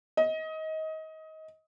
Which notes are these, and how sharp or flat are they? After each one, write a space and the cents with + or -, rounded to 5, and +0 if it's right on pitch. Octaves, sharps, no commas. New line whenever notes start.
D#5 +25